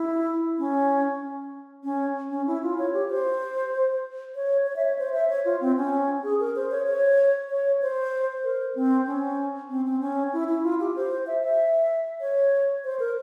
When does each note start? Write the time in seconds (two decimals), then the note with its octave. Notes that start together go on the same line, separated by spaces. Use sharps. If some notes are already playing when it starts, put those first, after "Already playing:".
Already playing: E4
0.58 C#4
1.84 C#4
2.31 C#4
2.47 E4
2.63 F4
2.78 C#5
2.93 G4
3.10 C5
4.35 C#5
4.67 C#5
4.76 E5
4.85 C#5
4.99 C5
5.14 E5
5.30 C#5
5.45 F4
5.61 C4
5.77 C#4
6.24 G#4
6.40 A#4
6.56 C5
6.71 C#5
6.87 C#5
7.50 C#5
7.82 C5
8.44 A#4
8.75 C4
9.07 C#4
9.70 C4
9.85 C4
10.01 C#4
10.33 E4
10.48 E4
10.63 F4
10.80 G4
10.96 C5
11.27 E5
11.43 E5
12.21 C#5
12.84 C5
13.00 A#4